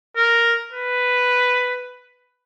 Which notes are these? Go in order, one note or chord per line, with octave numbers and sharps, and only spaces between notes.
A#4
B4